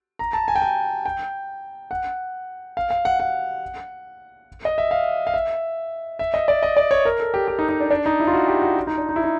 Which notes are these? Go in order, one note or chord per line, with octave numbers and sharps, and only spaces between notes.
A#5
A5
G#5
G5
G#5
G5
F#5
F5
F5
F#5
F#5
D#5
E5
F5
F5
E5
E5
D#5
D5
D#5
D5
C#5
A#4
A4
G4
G4
D#4
D#4
D4
D4
D#4
E4
F4
F#4
G4
F#4
F4
D#4
D4
D#4
E4
D#4